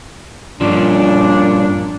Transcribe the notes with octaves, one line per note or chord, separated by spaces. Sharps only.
G2 A#2 F3 C#4 D4